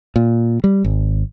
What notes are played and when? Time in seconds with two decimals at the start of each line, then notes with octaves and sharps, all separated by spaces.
0.16 A#2
0.64 G3
0.84 G#1